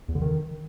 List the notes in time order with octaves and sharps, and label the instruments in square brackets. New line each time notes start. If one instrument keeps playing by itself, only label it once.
[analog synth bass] E2
D3
D#3